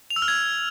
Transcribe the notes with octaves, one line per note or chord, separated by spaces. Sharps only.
F7
E6
F6
G#6